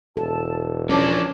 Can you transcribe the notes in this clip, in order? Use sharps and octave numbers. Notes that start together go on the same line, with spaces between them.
E1 A4 A5
F3 C#4 D4 C#5 A5 D6